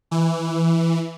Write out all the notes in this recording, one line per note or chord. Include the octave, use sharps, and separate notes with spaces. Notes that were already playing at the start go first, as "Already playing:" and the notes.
E3